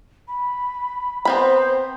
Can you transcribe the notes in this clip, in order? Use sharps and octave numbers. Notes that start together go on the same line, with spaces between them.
B5
B3 C4 C5 B5